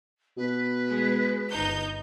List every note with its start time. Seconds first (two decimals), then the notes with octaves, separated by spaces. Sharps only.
0.37 B2 B4
0.88 G#3
1.49 G1 D#4 G6